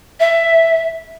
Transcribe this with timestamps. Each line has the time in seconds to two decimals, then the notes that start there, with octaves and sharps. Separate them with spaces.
0.20 E5